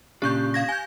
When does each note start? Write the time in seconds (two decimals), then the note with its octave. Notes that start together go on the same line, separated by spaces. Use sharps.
0.22 A#2 C#3 D4 G4 C#6 G6
0.54 F5 G#6 A#6
0.69 G#5 G6